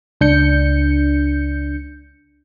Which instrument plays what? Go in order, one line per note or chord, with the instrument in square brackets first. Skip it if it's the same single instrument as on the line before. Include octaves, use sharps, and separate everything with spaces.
[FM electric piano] C#2 D4 G6 C#7